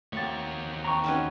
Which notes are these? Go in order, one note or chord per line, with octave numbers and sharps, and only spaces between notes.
D#2 A3 A#3 C4 F#4 C#5 A6
C4 A5 A#5 C#6
C4 C#4 D#4 F#4 B4